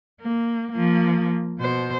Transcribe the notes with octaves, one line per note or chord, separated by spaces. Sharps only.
A#3
F3 A#3
B2 C5